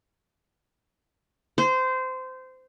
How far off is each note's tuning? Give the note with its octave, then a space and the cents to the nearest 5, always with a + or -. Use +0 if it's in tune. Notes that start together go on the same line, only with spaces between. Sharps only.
C5 -20